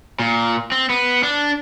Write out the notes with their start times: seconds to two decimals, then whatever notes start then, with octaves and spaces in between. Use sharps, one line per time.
0.19 A#2
0.72 C4
0.90 B3
1.23 D4